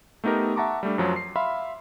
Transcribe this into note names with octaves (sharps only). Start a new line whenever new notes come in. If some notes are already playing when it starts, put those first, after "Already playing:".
A3 B3 D#4 G4 A#4
E5 F#5 A5 A#5 C#6 D6
G3 A3 D4
F#2 F3 F#3
C7
E5 F5 B5 C6